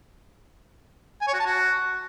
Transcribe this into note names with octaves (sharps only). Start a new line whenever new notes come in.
G#5
C#5
F#4
A5
F#4